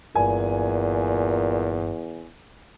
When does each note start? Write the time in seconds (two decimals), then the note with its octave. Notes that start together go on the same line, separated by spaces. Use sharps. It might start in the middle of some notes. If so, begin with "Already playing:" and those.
0.15 G1 E2 G2 A#2 G#5